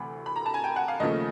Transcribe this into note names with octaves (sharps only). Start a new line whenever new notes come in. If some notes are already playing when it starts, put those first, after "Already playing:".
Already playing: D2 C3 E3 A3 B5
B5
A#5
A5
G#5
G5
F#5
F5
D#2 C#3 F3 A3 D#5